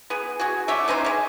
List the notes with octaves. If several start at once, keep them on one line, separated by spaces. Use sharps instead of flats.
B3 G#4
F#4 G#4
D3 A3 C#5 E5
B3 C#4 D#4 C5
G#3 C#4